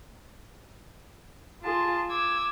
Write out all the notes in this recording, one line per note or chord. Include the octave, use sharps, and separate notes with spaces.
F4 G#4 A5 C6
D6 E6 G#6